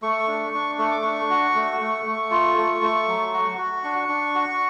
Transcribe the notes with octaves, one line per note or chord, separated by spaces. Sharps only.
A3 C#6
D4
D4
A3 C#6
D6
D4 C#6
F#4
A3
A3
A3
F4
A3
A3
F#3
F#4
F#4
D4 C#6
D4
F#4